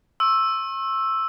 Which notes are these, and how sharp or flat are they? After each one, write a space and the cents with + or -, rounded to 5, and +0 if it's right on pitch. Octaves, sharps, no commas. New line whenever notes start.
C#6 -45 E6 +0